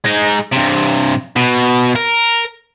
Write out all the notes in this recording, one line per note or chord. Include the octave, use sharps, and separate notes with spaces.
G#3 D#4
G2 C3
B2
A#4